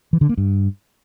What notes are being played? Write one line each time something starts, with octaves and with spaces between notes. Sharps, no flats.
E3
D3
A#3
G2